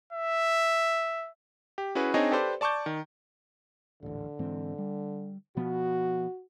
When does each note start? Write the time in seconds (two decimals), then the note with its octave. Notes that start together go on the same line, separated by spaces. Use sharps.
0.13 E5
1.78 G4
1.95 C#4 E4 F#4 G#4 B4
2.14 C4 D4 D#4 G#4 C#5 D#5
2.31 G4 A4 B4 C5 D5
2.61 D5 A5 C#6 D6 G6
2.86 D#3
4.03 D#1 A1 D3
4.39 G#2 E3 C4
4.78 G3
5.57 B2 F3 B3 F#4